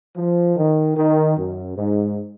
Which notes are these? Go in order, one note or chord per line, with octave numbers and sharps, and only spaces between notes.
F3
D#3
D#3
F#2
G#2